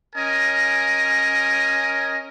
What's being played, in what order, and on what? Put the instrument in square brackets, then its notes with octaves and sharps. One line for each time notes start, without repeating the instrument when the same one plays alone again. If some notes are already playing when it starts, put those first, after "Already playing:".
[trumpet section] C#4 A#4 D#5 G#5